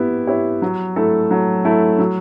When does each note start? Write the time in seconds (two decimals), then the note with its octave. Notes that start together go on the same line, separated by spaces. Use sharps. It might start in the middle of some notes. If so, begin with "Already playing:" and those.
Already playing: B3 E4 G4
0.27 E4 G4 C#5
0.62 F#3
0.96 A3 E4 A4
1.31 F#3
1.65 A3 E4 A4
1.98 F#3